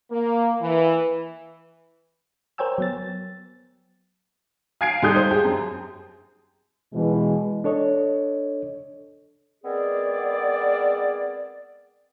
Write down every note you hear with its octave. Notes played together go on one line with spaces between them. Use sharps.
A#3
E3
A#4 C5 C#5 G5 G#5 E6
F#3 B3 A6
F5 G#5 G#6 C7 D7
G#2 G3 G4 A4 D#6 G6
C5
G4 G#4
F#2
B2 E3 G#3
D4 A4 C#5 D#5
G#3 B3 C4 G#4 A#4 D5